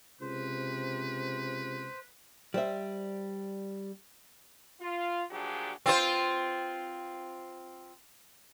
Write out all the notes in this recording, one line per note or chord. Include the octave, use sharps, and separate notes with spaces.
C#2 C3 B4 C5
G3 C5 E5
F4
A#2 F3 F#3 D4 G4 G#4
C4 F4 C5